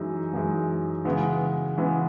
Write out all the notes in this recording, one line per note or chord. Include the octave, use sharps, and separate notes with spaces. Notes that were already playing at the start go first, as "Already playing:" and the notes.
Already playing: F#2 E3 G#3 D#4
F#2 E3 G#3 D#4
C#3 E3 G#3 B3
C#3 E3 G#3 B3